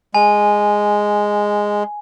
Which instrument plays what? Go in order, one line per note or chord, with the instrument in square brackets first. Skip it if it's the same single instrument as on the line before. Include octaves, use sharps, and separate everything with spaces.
[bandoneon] G#3 [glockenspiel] G#5